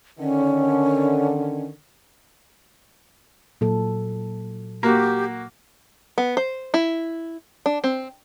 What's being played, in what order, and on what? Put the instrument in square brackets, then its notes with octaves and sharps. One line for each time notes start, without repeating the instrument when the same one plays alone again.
[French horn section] D3 D#3 [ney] C#4
[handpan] A#2 F#3 A4
[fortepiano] A#3 F#4 [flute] G4
[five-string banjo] B3
C5
E4
D4
C4